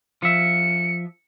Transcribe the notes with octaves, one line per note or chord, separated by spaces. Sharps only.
F3 E5 C#7